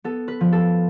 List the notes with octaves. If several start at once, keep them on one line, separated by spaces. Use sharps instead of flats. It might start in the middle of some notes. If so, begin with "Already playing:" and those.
B3 A4
B4
F3
A4